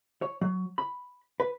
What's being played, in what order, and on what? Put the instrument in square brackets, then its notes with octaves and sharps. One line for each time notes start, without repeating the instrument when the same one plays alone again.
[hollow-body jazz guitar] C#5
F#3
B5
B4